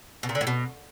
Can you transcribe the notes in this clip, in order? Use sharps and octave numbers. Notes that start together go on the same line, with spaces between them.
B2
A#2
D3
A2
B2